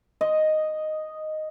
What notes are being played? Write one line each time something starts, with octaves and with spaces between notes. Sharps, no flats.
D#5